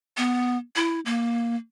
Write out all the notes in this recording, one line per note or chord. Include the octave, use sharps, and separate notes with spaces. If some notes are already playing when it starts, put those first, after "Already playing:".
B3
E4
A#3